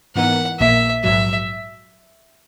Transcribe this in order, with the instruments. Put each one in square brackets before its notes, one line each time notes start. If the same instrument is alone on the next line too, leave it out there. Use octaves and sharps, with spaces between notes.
[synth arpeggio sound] G#2 E3 B3 D#4 A#4 [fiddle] F#5
[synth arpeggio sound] A#1 A#2 A#3 [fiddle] E5
[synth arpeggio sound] A#1 G#2 F#3 [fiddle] E5